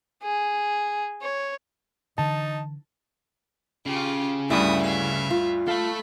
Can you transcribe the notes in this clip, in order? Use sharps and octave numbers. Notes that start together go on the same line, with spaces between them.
G#4
C#5
D3 E3 D#4 A5
C#3 F4 G4
D2 G2 E4 E5 D#6
E5 F5
F4
A4 E5 F5 B5